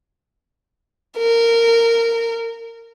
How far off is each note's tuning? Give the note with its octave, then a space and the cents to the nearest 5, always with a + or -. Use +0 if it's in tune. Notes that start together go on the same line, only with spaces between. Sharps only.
A#4 -15